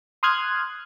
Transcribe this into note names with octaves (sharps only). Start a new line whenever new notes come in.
C6 D#6 F6 F#6 G#6